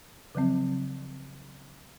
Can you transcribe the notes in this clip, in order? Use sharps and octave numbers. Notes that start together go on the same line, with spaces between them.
C#3 F3 F#3 C4